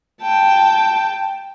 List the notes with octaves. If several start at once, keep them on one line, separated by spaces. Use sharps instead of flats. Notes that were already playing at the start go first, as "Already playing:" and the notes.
G5 A5